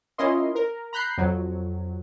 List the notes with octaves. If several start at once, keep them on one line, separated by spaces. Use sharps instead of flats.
C#4 E4 F4 A#4 D#5 C6
A#4
A#5 B5 F#6 G6 C7
F2 F#3